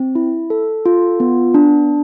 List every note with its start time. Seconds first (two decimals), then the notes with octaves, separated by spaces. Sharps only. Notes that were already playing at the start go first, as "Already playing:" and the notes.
Already playing: C4
0.15 E4
0.50 A4
0.86 F4
1.20 B3
1.54 D4